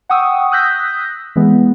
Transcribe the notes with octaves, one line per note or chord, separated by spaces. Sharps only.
F#5 G5 C#6 D#6 E6
D#6 E6 F#6 G6 A#6 B6
E3 G#3 B3